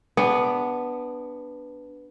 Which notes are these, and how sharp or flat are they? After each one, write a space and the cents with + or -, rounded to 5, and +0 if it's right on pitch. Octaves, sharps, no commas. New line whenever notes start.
B3 +0 D4 +0 G#4 -35